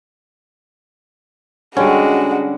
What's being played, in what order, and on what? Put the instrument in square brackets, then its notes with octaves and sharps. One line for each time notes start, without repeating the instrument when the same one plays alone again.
[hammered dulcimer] D3 [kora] G3 C#4 [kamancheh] G#3 F#4